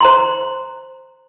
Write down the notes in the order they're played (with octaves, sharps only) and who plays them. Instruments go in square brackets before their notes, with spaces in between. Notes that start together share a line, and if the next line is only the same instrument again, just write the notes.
[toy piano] C5 A#5 C6